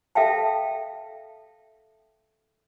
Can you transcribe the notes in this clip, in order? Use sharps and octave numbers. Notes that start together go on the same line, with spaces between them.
A4 E5 F5 G5 A5